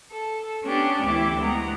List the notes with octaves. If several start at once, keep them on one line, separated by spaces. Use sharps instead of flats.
A4
B3 C#4 D4 G4
D2 E3 E4 G4 D6
D2 G#3 B3 A#5